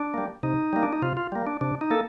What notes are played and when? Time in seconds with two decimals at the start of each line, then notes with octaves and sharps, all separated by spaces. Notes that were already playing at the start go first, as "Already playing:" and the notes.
Already playing: D4
0.14 G3 A#3
0.43 C3 D#4
0.73 G3 A#3
0.83 D4
0.93 D#4
1.02 C3 F4
1.17 F4
1.32 G3 A#3
1.47 D4
1.61 C3 D4
1.81 D#4
1.90 A#3 A4